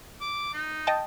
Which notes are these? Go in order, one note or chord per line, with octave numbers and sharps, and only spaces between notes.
D6
D#4
D#5 G5 A5